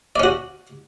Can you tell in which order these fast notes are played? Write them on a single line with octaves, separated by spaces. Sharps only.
D5 C#4 F#4